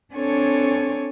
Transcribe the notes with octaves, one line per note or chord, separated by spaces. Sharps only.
C4 D4 A4 C#5 G#5 C#6